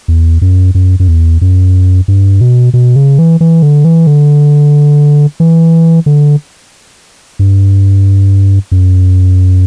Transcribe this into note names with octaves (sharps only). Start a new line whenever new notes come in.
E2
F#2
F#2
F#2
E2
F#2
G2
B2
B2
C#3
E3
E3
D3
E3
D3
E3
D3
G2
F#2